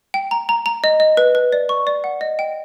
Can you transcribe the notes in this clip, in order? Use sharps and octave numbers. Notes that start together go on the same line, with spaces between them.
G5
A#5
A#5
A#5
D#5
D#5
B4
B4
D5
C#6
D5
F#5
D#5
G5